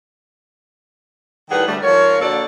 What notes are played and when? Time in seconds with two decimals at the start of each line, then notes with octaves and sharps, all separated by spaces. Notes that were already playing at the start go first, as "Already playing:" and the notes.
1.50 A2 D#3 G3 G#4 B4 F#5
1.67 D2 G3 A3
1.82 G#2 F3 A#4 C#5
2.20 D3 A#3 F#4 A4 C#5 D5